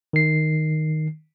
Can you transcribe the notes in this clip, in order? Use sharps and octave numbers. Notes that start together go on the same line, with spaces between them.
D#3 C7